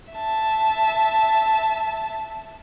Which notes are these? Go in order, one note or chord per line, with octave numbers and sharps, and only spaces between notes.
E5 A5